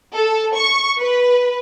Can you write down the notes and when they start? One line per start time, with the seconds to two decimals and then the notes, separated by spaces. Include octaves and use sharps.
0.15 A4
0.55 C#6
1.00 B4